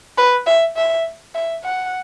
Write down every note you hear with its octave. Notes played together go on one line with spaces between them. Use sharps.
B4
E5
E5
E5
F#5